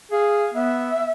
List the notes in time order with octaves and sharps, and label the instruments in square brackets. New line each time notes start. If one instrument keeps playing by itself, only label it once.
[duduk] G#4 [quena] F5
[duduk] B3 [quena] E5